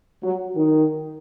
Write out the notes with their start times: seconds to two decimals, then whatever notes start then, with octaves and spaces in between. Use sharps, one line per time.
0.22 F#3
0.55 D#3